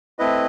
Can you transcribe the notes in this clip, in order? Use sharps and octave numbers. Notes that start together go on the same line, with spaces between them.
A3 C4 E4 B4 D#5